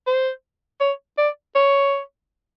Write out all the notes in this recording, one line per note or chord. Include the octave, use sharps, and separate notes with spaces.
C5
C#5
D5
C#5